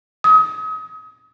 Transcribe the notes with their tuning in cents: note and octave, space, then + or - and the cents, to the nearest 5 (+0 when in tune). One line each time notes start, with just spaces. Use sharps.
D#6 +35